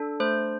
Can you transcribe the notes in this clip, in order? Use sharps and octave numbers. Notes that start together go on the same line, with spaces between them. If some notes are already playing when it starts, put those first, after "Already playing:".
Already playing: D4 A4
A3 C5